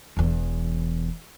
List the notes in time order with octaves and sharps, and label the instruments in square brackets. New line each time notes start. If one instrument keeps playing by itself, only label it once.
[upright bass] E1 E2